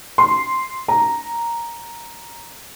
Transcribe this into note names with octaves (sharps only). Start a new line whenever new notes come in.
C6
A#5